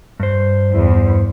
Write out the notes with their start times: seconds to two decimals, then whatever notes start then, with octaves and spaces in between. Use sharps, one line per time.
0.20 G2 C5
0.72 E2